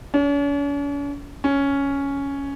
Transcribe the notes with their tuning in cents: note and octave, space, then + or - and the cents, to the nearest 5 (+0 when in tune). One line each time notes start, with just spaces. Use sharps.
C#4 +45
C#4 +5